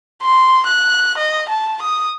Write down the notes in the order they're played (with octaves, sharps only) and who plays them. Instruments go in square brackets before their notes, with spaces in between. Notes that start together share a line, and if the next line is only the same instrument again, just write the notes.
[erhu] C6
F#6
D#5
A5
D#6